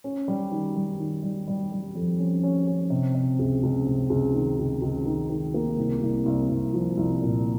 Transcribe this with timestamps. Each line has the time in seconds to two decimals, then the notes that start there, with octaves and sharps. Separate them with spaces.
0.04 C#4
0.28 G3
0.52 D#3
0.76 G3
1.00 D#3
1.23 G3
1.48 G3
1.72 G3
1.95 F2
2.19 C#4
2.43 C#4
2.67 C#4
2.90 C3
3.15 C3
3.39 C#2
3.63 C#2
3.86 C3
4.10 C#2
4.34 D#3
4.59 C#2
4.82 C#2
5.06 D#3
5.30 D#3
5.54 A#3
5.78 C2
6.01 C2
6.26 C2
6.49 C2
6.73 F3
6.97 C2
7.21 A#2